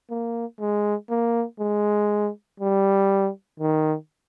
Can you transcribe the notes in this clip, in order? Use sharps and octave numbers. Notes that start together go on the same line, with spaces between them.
A#3
G#3
A#3
G#3
G3
D#3